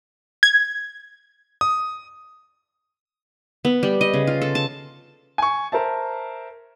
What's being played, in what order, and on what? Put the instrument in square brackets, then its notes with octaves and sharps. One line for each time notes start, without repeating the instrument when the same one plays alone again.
[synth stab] G#6
[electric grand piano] D#6
[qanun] B3
G3
D#5
C#3
F4
A4
A5
[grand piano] G#5 C#6
A#4 C5 E5 A5